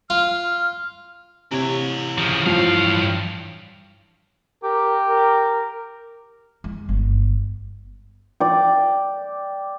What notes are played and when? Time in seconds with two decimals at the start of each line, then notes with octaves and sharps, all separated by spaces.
0.10 F4 F6
1.51 C3 E3 C#5
2.18 C#3 F3
2.46 G2 F3 F5
4.63 G4 A#4
5.09 A#4
6.64 G#3
6.89 G1
8.40 D5 G5